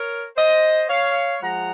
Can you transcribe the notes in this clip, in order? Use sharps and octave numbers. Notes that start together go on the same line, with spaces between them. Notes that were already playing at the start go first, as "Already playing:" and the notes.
Already playing: A#4 C#5
C5 D#5
C#5 F5
F3 G#3 F#5 A#5